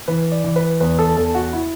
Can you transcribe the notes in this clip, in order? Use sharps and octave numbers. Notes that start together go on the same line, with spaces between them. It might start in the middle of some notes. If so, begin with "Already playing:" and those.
E3 B4
D5
E3
B4
E2 B4
A4
E2 A4
F#4
E4